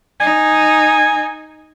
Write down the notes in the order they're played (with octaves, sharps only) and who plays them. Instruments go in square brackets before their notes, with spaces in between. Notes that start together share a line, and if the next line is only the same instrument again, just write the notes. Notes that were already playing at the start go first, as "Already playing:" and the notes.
[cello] D#4 [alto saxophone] G#5